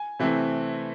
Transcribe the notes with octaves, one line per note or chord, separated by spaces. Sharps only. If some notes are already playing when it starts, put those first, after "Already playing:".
Already playing: G#5
C3 E3 A3 C4